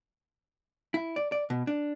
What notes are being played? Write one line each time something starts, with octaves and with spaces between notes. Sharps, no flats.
E4
D5
D5
B2
D4